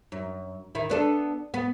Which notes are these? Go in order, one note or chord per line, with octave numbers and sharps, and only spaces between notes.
F#2
D#3 E4
B3 D4 A4
B3